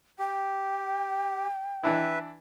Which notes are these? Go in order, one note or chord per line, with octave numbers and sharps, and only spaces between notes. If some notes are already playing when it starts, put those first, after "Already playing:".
G4 G5
E3 D4 E4 B4 E5